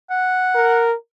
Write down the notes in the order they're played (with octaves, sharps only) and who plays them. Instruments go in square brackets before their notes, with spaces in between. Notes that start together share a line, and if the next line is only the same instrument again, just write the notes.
[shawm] F#5
[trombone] A#4